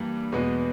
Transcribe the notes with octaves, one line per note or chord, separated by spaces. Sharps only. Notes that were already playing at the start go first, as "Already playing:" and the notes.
Already playing: G2 E3 G3 A#3
E2 B2 G#3 B3